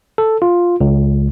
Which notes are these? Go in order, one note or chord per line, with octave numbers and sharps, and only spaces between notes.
A4
F4
C#2